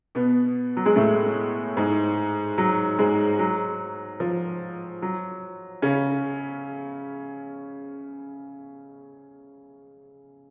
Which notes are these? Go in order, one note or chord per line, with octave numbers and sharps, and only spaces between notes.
B2 B3
F#3
G#3
A2 A3
G#2 G#3
F#3
G#2 G#3
F#3
F3
F#3
C#3 C#4